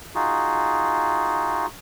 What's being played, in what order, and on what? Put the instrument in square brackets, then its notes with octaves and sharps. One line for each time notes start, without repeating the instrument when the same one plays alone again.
[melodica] D#4 F4 F#4 G#4